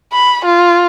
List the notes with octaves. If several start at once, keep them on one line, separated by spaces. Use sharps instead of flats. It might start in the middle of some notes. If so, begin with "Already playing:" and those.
B5
F4